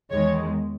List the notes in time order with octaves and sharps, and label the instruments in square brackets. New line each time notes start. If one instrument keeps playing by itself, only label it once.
[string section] E2 D#3 G#3 C#5